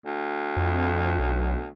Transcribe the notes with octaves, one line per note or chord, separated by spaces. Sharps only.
D2
F2
B1